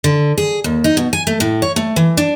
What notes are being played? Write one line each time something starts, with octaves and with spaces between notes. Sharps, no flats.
D3
G#4
D#2
D#4
B2
G#5
A3
A2
C#5
A3
E3
D4